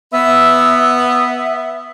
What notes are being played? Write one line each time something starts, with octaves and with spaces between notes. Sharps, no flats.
B3 E5 E6
E5